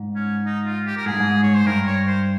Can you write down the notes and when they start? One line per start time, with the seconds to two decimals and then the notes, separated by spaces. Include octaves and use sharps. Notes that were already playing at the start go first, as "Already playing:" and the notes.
Already playing: G#2
0.15 C#4
0.45 D#4
0.66 F4
0.86 G4
0.97 A#4
1.06 G#2 G#4
1.13 G2
1.20 G#2
1.43 C#5
1.55 C5
1.66 G2 A#4
1.86 C#5
2.07 C5